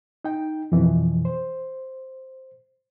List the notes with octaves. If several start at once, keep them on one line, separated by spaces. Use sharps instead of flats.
D#4 G5
F2 B2 E3
C5